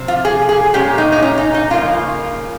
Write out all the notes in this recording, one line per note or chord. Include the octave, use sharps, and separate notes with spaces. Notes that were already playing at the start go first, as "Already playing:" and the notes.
Already playing: C3 F3 C4
F4
G#4
G#4
A#2 G#3 C#4 G4
D#4
D#4
C#4
D#4
D#4
C#3 F3 A#3 F4